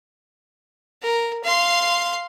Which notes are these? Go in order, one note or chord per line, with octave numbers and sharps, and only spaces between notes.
A#4
F5 C6